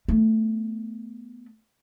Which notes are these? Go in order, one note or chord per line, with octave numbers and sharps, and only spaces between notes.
A3 B3